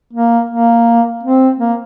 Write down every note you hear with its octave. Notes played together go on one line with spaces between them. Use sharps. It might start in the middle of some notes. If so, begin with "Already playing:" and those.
A#3
A#3
C4
A#3